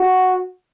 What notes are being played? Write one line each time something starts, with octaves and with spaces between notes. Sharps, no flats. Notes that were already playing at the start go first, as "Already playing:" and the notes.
Already playing: F#4